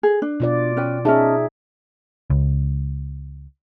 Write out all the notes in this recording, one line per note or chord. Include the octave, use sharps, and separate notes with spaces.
G#4
D4
B2 F4 D5
C#4 B4 G5
C#4 D#4 G#4 D#5 E5 A5
C#2